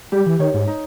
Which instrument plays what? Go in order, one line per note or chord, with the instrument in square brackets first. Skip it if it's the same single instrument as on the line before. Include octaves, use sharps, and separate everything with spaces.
[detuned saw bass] G3 [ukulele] G4
[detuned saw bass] E3
[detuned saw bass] D#3 [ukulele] C#5
[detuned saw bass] G#2
[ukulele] D#4